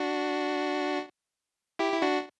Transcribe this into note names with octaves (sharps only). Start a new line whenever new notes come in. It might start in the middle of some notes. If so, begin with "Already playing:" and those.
Already playing: D4 F#4
E4 G4
E4
D4 F#4